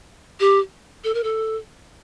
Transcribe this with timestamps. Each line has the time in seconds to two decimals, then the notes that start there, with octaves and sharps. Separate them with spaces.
0.40 G4
1.04 A4
1.14 A#4
1.24 A4